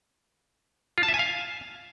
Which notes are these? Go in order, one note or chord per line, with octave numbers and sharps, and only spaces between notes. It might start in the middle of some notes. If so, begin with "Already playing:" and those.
F4
A5
E5
G#5
F5